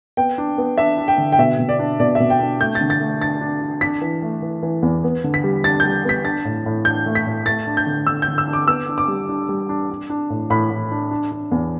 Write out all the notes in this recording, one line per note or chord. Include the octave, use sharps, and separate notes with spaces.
B3 G5
D4
B3
D4 E5
D4
G5
D3
G5
B2 E5
B2
D5
D4
B2 D5
E5
B2
G5
D4
A3 G6
A6
D3
A6
A3
D4 A6
D4
D4
D4 B6
E3
A3
E3
E3
E2
B3
D3
B6
G3
D4 A6
G6
G3
B3 B6
D4 A6
A2
A2
D4 G6
A3
B6
A2
A3 A6
D4
G6
D3
D3 E6
G6
D3
E6
D4
D6
B3 E6
D4
D6
G3
D4
G3
D4
D4
D4
A2
A2 B5
A2
D4
D4
D4
E2